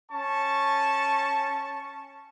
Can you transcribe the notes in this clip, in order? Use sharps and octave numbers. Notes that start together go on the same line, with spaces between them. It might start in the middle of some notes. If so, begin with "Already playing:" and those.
C#4 A5 C#6